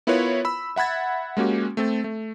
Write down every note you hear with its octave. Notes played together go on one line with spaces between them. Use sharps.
B3 E4 F4 A#4 B4 C#5
B5 E6
E5 F#5 B5 G#6 A6
G#3 A#3 C#4 F#4 G4
A3 C4 A4
A3